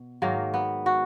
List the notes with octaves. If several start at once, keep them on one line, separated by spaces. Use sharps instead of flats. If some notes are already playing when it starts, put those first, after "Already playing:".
Already playing: B2
G#2 D#3 F#3 A#3
B3
F#4